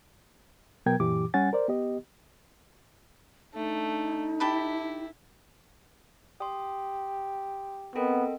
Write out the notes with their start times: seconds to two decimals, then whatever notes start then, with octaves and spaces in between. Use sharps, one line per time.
0.86 B2 F#3 B3 A#4 G5 G#6
1.00 F#2 A#2 E3 G4 D6
1.34 G3 C#4 F#5 G#5 A6
1.53 A#4 C5 D5
1.68 B3 G4 D#5
3.54 A3 D4 D#4
4.40 E4 G4 A5 B5
6.40 G4 C6 D#6
7.96 B3 C4 A4 A#4 D#5 F#5 G5